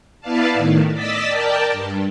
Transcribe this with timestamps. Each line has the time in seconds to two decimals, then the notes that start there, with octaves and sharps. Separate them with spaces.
0.21 B3 E4 B4 D5 F5 A5
0.54 A2 D#3
0.94 D5 D#5 E6 A6 B6
1.27 A#4 D5 G5 A5
1.72 G2